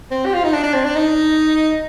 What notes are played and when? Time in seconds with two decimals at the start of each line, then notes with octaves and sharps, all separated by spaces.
0.11 C4
0.25 G4
0.34 F4
0.44 D#4
0.53 D4
0.63 D4
0.74 C4
0.84 D4
0.95 D#4